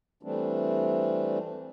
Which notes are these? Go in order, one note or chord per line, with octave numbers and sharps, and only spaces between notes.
E3 G3 A3 C4 D4